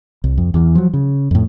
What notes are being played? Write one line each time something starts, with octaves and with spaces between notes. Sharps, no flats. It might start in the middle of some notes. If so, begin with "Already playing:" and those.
C2
F2
E2 E3
F3 F#3
C#3
F2 A2